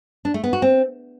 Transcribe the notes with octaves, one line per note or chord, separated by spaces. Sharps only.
D4
A3
B3
F#4
C4